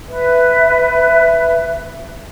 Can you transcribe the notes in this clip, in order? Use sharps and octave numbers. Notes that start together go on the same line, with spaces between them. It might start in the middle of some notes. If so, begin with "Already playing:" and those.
B4 E5